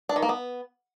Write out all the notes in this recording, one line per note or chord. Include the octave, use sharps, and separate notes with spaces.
D4
D#3
A#3
B3